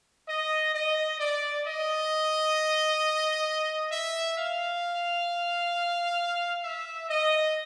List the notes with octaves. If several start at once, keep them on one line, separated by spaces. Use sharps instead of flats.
D#5
D#5
D5
D#5
E5
F5
E5
D#5